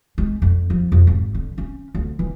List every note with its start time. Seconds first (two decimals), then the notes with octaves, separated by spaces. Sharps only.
0.18 G#3
0.42 F2
0.70 F3
0.92 F2
1.07 G#1
1.34 D3
1.58 C#4
1.95 D2
2.19 E3